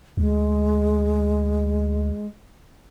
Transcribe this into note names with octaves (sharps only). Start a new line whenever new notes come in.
D2 G#3